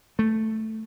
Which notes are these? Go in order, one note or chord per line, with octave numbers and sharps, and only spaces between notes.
A3